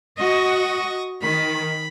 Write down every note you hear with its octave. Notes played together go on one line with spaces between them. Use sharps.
F#4 D#5 C#6 D#6
D#3 B5